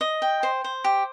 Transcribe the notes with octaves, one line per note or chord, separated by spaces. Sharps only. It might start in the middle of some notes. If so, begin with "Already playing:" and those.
D#5
G5
C5
C5
G4